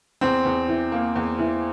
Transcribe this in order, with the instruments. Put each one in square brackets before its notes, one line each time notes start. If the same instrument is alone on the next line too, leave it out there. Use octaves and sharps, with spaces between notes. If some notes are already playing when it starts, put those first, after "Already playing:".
[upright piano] E2 [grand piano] C4
[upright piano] E2
E3
A#3
E2
E3